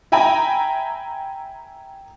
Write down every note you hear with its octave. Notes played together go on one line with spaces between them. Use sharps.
E5 G5 G#5 A#5 B5